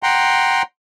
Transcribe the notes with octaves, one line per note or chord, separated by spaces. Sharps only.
F#5 G5 A#5 C6